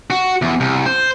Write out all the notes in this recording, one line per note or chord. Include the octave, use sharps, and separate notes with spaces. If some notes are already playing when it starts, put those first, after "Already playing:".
F#4
E2
C2
C5